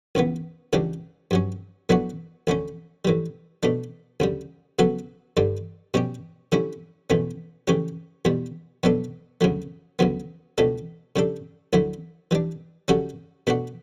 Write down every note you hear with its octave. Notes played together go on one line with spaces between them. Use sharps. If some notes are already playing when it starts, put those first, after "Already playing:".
C#2 C#3 E3 B3
C#2 C#3 E3 G3 D4
G2 F#3 C#4
A2 F#3 B3 D4 F#4
D2 D3 A3 C#4
A2 E3 G3
B2 A3 D4
D2 C#3 G3
C#3 F#3 B3 F#4 A4
G2 D3 G3 D4
B2 G3 C#4 G4
D3 G3 C#4 E4
E2 B2 A3 C#4
C#3 E3 A3 C#4 G4
E2 B2 G3
B2 F#3 B3 D4 A4
D2 C#3 F#3 A3
D2 C#3 F#3 B3
C#2 B2 A3 D4 A4
C#3 G3 D4 A4
D2 D3 F#3 A3 E4
E3 G3 D4
C#3 G3 C#4 F#4 A4
B2 A3 D4 F#4